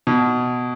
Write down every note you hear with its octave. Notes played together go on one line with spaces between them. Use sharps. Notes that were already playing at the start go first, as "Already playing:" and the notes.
B2